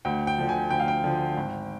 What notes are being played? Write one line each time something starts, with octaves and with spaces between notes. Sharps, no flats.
D2 G5
G5
D3 F3
G#5
D2 G5
F5
G5
D3 F3
G#1